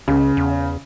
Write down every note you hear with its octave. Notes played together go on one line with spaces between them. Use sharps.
C#2 C#3
E2